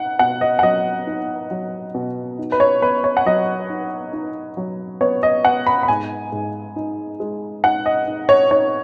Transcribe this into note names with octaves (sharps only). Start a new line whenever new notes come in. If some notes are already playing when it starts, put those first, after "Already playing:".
Already playing: D#4 F#5
B2 F#5
D#5
F#5
F#3 D#5
D#4
F#3
B2
D#4
B4
C#5
B3 B4
C#5
F#5
F#3 D#5
D#4
D#4
F#3
B3 C#5
D#5
B3 F#5
B5
B5
G#2 G#5
G#2
D#4
G#3
D#4 F#5
D#5
D#4
C#5
D#4 C#5